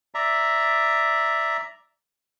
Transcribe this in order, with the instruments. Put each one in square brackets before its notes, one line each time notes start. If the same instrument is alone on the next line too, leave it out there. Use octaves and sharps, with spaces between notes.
[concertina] D5 E5 A#5